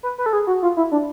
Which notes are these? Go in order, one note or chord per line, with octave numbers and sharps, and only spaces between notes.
B4
B4
A4
G#4
F#4
F4
E4
D4